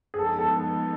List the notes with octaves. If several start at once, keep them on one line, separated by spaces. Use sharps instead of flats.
G#4
F3 G#3 B3 D#4 A4
A4